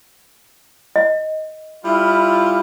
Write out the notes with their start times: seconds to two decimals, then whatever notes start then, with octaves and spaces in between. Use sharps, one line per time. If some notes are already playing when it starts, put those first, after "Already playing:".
0.96 D#5
1.84 G3 E4 F4